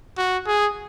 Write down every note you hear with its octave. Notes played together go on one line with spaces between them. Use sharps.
F#4
G#4